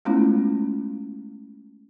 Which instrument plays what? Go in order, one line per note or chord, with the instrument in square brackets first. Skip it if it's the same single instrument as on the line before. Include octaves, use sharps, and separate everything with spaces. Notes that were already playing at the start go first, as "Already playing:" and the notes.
[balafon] G#3 A3 B3 C#4 E4 F4